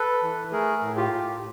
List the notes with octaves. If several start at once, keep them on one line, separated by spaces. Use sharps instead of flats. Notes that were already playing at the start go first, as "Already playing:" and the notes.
Already playing: A4 B4
E3
A3 G#4 A#4
A2
F4 G4
A2